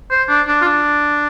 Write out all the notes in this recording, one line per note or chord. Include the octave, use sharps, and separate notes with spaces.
C5
D4
D4
F4
D4